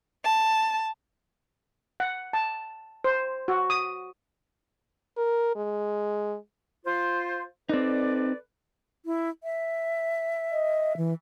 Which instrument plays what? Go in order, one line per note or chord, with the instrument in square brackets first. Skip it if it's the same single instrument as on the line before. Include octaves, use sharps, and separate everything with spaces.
[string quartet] A5
[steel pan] F#5
A5
C5
F#4
D#6
[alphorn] A#4
G#3
[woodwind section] F4 C5
[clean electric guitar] C4 D#4 [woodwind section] A4 B4 D5
[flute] E4
E5
[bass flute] D#5
E3